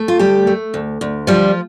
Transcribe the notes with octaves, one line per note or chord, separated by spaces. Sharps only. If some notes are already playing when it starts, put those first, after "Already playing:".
Already playing: A3
F4
D2 G3 G4
A3
D2
D2
F3 G3 F4